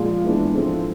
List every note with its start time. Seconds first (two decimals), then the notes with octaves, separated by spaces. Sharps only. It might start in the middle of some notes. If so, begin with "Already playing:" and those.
Already playing: A#2 F3 G#3
0.24 G#2 E3 G#3 B3 D4
0.54 F3 G#3 C4 E4 A4